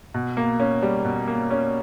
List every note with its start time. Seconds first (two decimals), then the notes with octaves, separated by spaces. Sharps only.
0.14 B2
0.37 A#3
0.60 C#4
0.83 G3
1.05 B2
1.27 A#3
1.51 C#4